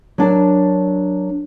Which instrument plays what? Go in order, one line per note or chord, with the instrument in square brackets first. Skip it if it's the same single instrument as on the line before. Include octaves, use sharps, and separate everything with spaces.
[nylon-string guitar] F#3 D4 A#4 A5